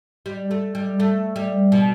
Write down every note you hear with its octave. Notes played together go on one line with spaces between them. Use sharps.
G3
A3
G3
A3
G3
B2